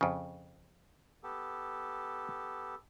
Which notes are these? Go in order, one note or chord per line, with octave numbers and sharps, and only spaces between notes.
F2 C#3
B3 G4 A4